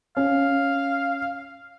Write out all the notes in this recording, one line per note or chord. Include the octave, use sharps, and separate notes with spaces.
C#4 F5